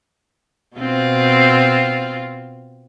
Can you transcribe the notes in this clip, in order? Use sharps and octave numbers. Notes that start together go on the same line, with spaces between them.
B2 C4 F4